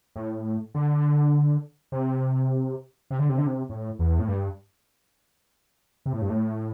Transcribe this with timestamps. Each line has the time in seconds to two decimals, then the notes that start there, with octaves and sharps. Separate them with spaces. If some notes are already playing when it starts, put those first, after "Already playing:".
0.16 A2
0.75 D3
1.92 C3
3.11 C3
3.19 D3
3.29 C3
3.38 D3
3.47 C3
3.69 A2
3.99 E2
4.19 A2
4.28 G2
6.06 C3
6.13 A2
6.22 G2
6.30 A2